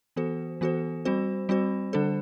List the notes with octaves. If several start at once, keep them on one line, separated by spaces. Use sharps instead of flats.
E3 B3 F#4 A4 C5
E3 B3 F#4 A4 C5
G3 C4 F#4 C5
G3 C4 F#4 C5
D3 G3 D4 A4 C5